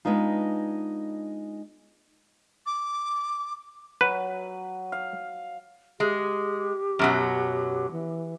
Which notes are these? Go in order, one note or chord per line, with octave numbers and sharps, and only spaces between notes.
G#3 B3 D4 D#4 F4
D6
F#3 B4
F5
G#3 G4
F#2 B2 F#3
E3